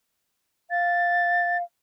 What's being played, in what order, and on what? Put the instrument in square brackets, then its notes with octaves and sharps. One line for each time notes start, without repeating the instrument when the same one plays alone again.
[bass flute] F5 [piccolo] A6